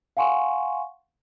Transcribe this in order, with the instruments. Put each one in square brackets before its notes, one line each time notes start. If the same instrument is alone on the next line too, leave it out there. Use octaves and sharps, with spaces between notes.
[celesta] F5 F#5 G#5 C6 C#6